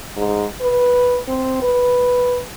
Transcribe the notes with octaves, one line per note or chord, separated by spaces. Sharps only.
G#2
B4
C4
B4